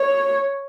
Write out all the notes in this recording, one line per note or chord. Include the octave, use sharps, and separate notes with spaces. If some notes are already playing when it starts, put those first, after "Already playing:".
Already playing: C#5